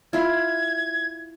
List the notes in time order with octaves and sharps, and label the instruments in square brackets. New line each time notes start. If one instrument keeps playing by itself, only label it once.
[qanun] E4 F4 [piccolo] G#6